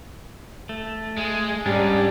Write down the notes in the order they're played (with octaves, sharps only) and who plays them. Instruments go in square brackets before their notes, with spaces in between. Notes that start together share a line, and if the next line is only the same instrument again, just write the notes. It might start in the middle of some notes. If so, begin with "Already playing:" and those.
[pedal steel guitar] A3
[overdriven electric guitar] G#3
[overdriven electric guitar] G#2 [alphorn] G3 [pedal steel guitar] C#4 D4